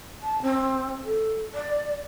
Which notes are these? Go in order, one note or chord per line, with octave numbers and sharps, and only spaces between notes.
A5
C4
A4
D5